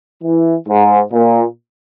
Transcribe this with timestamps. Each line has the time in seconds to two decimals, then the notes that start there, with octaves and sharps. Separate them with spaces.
0.23 E3
0.68 G#2
1.13 A#2